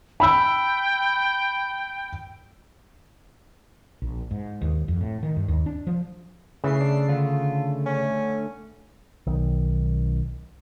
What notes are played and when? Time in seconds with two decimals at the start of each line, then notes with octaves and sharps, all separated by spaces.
0.20 G5 B5 E6
4.02 A#1
4.31 G#2
4.62 D#2
4.88 F2
5.01 A2
5.23 D#3
5.36 G2
5.48 D#2
5.66 D4
5.87 F3
6.64 C#3 E3 A3 C7
6.80 D4
7.08 D3 A3 F4
7.86 C#4
9.27 B1 D#3